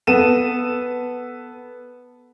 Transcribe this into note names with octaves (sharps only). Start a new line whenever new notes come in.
B3 A4 D#7 E7